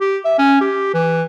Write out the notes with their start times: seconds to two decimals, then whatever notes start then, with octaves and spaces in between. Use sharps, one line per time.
0.01 G4
0.25 E5
0.39 C#4
0.61 G4
0.94 E3